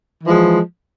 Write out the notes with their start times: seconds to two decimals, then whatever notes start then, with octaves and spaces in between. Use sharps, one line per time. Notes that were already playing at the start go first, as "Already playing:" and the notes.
0.23 E3
0.26 F3
0.28 G#3